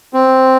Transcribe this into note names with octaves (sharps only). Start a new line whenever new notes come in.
C4